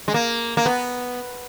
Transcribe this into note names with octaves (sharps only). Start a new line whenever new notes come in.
G#3
A#3
A#3
B3